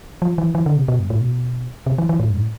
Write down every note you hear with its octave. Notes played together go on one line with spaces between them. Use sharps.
F3
E3
E3
D3
C3
B2
G2
A2
B2
C3
E3
E3
A2
G2
A2